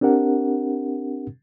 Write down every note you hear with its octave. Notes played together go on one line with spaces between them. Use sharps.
C4 D4 G4 A#4 F#5